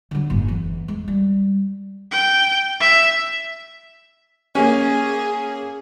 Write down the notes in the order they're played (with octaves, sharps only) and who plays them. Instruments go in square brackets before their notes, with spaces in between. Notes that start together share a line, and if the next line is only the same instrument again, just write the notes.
[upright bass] D3 F#3
F#1 G#2
E2
G#3
G3
[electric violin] G5
E5
[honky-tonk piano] A#3 C#4 [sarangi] G#4